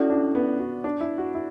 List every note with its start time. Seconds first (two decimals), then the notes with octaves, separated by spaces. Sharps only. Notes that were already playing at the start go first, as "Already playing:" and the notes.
Already playing: C#4 E4 F#4 A4 D5
0.10 D4
0.35 B3
0.59 F#4
0.84 D4
1.01 E4
1.18 F#4
1.35 E4